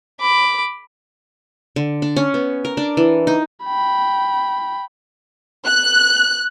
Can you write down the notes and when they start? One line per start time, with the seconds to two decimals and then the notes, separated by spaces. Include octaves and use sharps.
0.20 B5 D6
1.76 D3
2.02 D4
2.17 C#4
2.34 B3
2.65 A#4
2.77 D4
2.97 E3
3.27 D#4
3.64 G5 B5
5.67 F#6